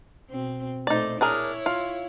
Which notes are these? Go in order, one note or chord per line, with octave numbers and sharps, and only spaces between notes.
B2 C4
A#2 A3 D#4 C5 D5
D4 E4 G#4 A#4 C#5
F4